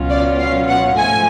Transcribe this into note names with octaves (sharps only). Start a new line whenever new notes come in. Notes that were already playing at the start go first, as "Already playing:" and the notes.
Already playing: C#2 B2 F#3 C#4 F4
D5
F5
F#5
G#2 F3 A3 G#5